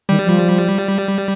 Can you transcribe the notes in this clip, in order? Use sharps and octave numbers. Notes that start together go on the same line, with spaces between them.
D#3 G3
F3